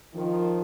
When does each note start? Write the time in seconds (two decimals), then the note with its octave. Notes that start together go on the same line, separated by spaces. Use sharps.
0.14 D#3 F3